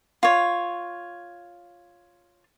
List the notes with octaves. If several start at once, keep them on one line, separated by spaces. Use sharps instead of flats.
F4 C#5